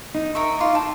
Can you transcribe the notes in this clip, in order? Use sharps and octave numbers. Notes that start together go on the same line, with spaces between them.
D#4
A#4 E5 C#6
F4 D5
G5 A5